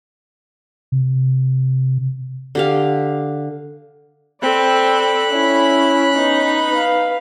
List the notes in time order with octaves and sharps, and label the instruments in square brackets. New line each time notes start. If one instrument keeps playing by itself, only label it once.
[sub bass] C3
[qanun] D3 G4 F5
[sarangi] C4 [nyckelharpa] A4 D5 [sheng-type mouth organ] B5 F#6
[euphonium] C#4 [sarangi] E4
[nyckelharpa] B3 [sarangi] D#4
[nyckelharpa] B4 F5